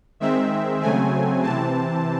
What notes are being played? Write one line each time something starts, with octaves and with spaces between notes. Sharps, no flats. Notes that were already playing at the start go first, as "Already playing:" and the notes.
D#3 G#3 C4 E5
C#3 F#3 A3 C4 G#5
C3 E3 C4 A5